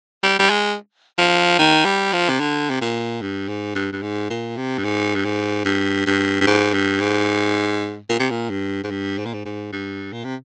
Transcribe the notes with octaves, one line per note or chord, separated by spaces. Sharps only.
G3
G3
G#3
F3
D#3
G3
F3
C3
D3
C3
A#2
G2
G#2
G2
G2
G#2
A#2
C3
G2
G#2
G2
G#2
G2
G2
G2
G#2
G2
G#2
A#2
C3
A#2
G2
G#2
G2
G#2
A#2
G#2
G#2
G2
A#2
C3